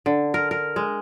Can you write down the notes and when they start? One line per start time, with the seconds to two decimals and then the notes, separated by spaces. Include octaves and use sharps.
0.06 D3
0.34 A#4
0.51 A#4
0.76 G#3